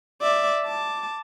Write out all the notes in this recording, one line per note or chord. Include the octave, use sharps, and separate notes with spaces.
D5 E5
A5 D6